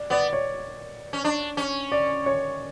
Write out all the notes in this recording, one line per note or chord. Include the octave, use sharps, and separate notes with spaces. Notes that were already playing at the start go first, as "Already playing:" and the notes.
Already playing: D5
B3 D5
C#5
C#4
D4
C#4
D5
C#5